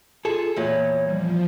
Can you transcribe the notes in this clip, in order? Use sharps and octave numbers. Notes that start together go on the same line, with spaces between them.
F4 G#4 A4
E2 A#2 C#5
F3 G3